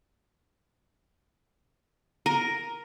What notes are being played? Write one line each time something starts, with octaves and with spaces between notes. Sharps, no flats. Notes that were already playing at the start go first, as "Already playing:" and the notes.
A#4